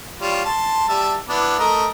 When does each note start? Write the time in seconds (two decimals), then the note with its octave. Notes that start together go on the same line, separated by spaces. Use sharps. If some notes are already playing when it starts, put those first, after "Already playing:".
0.21 G3 F4 C#5
0.45 A5 C6
0.89 G3 E5 A5
1.28 B3 D4 E4
1.59 A3 A#4 D#5